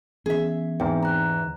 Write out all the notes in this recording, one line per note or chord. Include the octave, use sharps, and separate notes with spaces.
E3 B3 C#4 G#4 E5
E2 G#2 C4 D#4 G5
A#5 F#6